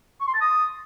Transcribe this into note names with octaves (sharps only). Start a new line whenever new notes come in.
C#6
C6
A5
D#6